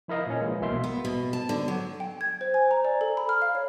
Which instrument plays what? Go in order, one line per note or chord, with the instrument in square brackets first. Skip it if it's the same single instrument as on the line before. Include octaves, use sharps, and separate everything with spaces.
[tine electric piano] F3 E4 A#4 D#5 F5
A#2 C#4
E3 F3 G#3 A#3
B1 B2 A#3 E5 C6
[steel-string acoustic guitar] B3
B2
A5
D3
F#3
[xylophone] G5
G#6
C5
G#5
A#5
D5
A4
B5
F6
F5
C#5